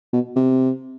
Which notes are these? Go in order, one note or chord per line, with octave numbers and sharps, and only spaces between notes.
B2
C3